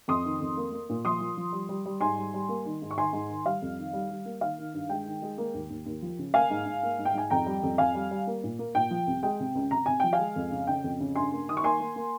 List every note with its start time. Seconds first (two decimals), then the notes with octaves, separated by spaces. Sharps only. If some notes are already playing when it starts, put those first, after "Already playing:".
0.08 F2 C6 D#6
0.25 D#3
0.41 F2
0.57 A#3
0.72 A#3
0.89 A#2
1.05 F3 C6 D#6
1.21 F3
1.37 F3
1.53 G3
1.69 G3
1.86 G3
2.01 G#2 G#5 C6
2.18 G3
2.34 G3
2.49 A#3
2.65 D#3
2.82 G#2
2.91 C#6
2.98 D#3 G#5 C6
3.13 G#2
3.29 D#3
3.46 G3 F5
3.62 F2
3.78 D#3
3.93 G3
4.10 G3
4.25 A#3
4.41 D#3 F5
4.58 D#3
4.73 G2
4.89 G#3 G5
5.06 D#3
5.22 G#3
5.38 A#3
5.54 D#2
5.70 D#2
5.86 D#2
6.02 F3
6.19 C#3
6.34 A#3 F5 G#5
6.50 G#2
6.66 G#2
6.83 A#3
6.99 G#2
7.05 G5
7.14 G#2 G#5
7.30 F2 G5 A#5
7.46 G3
7.63 F2
7.78 F2 F5 G#5
7.95 G3
8.11 G3
8.27 A#3
8.44 A#2
8.59 A#3
8.75 A#2 G5
8.91 F3
9.07 C2
9.23 G#3 G5
9.40 C3
9.55 C#2
9.71 C3 A#5
9.86 C3 G#5
10.00 F3 G5
10.13 F5 G#5
10.19 G#3
10.36 F2
10.51 C#3
10.67 C#3 G5
10.84 F2
11.00 C#3
11.16 G2 G#5 C6
11.32 A#3
11.48 D#3 D#6
11.57 C#6
11.63 A#3 G#5 C6
11.80 A#3
11.96 A#3